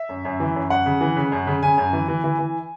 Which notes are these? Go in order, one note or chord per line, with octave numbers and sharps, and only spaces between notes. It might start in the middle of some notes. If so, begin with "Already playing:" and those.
Already playing: E5
F#2
F#2
E3
F#2
F#2 F#5
C#3
E3
C#3
F#2
C#3
C#3 G#5
F#2
E3
E3
E3
E3